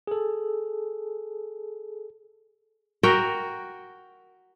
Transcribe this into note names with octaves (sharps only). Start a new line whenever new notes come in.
G#4 A4
F#4 A#4 E5 G5